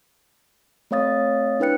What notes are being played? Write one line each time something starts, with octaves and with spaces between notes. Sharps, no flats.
A3 C4 C#5 F5 D#6 A6
D4 E4 B4 G5 F#6 C#7